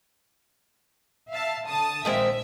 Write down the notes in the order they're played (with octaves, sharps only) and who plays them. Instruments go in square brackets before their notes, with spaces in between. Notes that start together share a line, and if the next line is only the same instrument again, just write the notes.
[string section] E5 F5 A5
D3 A5 D#6
[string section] A#1 E5 [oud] D#3 G#3 C4